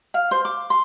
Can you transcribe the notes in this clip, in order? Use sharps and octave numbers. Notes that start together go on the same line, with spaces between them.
F5
C5
D6
C6